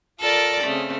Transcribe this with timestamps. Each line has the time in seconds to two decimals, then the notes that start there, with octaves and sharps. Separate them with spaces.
0.19 F4 A4 A#4 D5
0.63 C#3 A3 C4